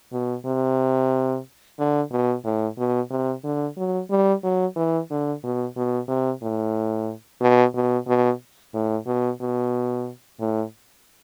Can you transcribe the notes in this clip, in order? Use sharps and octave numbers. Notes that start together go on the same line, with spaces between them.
B2
C3
D3
B2
A2
B2
C3
D3
F#3
G3
F#3
E3
D3
B2
B2
C3
A2
B2
B2
B2
A2
B2
B2
A2